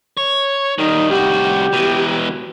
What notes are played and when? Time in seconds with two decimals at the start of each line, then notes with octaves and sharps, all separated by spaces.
0.17 C#5
0.78 D#3 G3 D#4
1.10 C2 F#4 G4
1.73 B2 E3